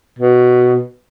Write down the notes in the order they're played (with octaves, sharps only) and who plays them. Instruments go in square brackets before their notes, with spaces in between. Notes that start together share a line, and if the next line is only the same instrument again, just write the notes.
[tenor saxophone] B2